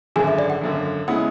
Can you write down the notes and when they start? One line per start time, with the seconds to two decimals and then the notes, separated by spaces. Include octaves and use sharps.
0.16 G#1 F#2 D3 G#4 G#5
0.27 E5
0.39 D5
0.50 F#5
0.61 G#1 F#2 D3
1.08 C#3 G#3 B3 E4 F#5